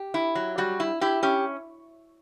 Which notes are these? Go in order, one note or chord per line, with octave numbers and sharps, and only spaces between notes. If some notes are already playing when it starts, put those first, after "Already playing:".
Already playing: G4
E4
F#3
G3 F#4
E4
E4 G4
C#4 G4